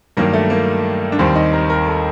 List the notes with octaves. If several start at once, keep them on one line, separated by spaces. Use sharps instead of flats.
G2 D#3 F#3 A#3
A3
A#3
D4
D#2 D#3 G3 C4
D#4
A#4
A#4
A4